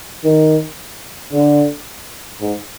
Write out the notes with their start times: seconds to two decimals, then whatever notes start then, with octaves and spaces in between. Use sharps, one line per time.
0.24 D#3
1.32 D3
2.41 G#2